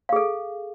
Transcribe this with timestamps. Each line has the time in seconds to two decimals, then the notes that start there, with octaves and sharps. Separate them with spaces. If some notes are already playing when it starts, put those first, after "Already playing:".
0.09 F5
0.13 G#4
0.16 A4